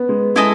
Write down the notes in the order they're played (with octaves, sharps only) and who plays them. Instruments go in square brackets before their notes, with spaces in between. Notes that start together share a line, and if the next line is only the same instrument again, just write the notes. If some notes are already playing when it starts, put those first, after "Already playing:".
Already playing: [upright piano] B3
G#3
[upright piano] G#3 [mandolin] E4 A4 D#5 G#5